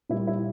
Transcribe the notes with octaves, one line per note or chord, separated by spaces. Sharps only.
A#2 G3 A#3 E4
E4